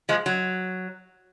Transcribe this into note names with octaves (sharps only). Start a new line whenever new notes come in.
F3 G#3
F#3